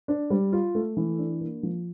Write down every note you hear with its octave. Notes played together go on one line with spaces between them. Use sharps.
D4
G3
F4
A3
E3
D4
A#3
F3